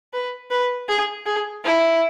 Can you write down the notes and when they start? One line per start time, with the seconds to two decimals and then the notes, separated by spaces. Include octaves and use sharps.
0.13 B4
0.51 B4
0.89 G#4
1.26 G#4
1.64 E4